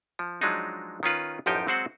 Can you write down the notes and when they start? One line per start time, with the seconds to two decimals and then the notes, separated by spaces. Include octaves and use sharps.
0.19 F3
0.41 F3 F#3 G#3 D4 D#4
1.03 D#3 C#4 F4 B4
1.46 A1 F#2 F3 D#4 G4 G5
1.67 F#3 G#3 C4 F#4 C5 F#5